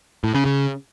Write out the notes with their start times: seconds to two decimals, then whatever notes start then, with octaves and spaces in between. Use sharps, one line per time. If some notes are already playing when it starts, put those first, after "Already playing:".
0.24 A2
0.34 C#3
0.45 C#3